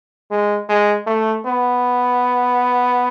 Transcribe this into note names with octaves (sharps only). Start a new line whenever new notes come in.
G#3
G#3
A3
B3